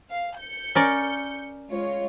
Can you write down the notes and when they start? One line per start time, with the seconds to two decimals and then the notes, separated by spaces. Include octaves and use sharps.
0.10 F5
0.40 G6 C#7
0.75 C#4 A#4 D5
1.70 G#3 F4 C#5